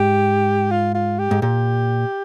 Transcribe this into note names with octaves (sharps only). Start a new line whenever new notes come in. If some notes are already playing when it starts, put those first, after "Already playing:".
Already playing: G#2 G4
F4
F4
G4
G#2
A#2 G4